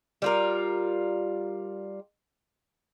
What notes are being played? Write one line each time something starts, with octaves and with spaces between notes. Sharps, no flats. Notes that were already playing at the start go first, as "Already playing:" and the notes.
G3 F4 A#4